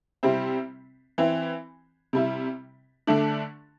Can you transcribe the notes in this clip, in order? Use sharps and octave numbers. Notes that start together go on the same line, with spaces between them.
C3 G3 C4 E4
E3 C4 E4
C3 G3 E4
D3 A3 D4